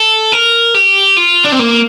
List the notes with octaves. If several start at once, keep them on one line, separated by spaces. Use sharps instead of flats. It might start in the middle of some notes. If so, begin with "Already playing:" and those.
Already playing: A4
A#4
G4
F4
D4
C4
A#3